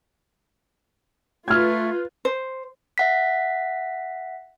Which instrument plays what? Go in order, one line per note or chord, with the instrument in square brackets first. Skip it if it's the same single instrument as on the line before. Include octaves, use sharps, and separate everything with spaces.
[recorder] A3 [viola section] F4 B4 [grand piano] F6 G#6
[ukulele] C5
[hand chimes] E5 F#5 B6